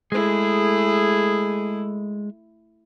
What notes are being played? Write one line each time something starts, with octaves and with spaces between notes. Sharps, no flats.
G#3 A3 E4 G#4